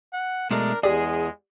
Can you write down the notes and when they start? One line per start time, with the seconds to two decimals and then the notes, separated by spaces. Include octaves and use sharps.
0.13 F#5
0.51 B2 G#3 A3 D4 A#4
0.83 E2 G#3 G4 G#4 D5